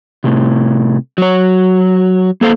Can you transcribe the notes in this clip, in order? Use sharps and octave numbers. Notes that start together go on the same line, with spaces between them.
A2 C3
F#3 C#5
A#3 A4 C5 F5